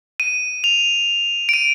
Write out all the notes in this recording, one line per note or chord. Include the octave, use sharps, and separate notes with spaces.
D#7
F7
D7
D#7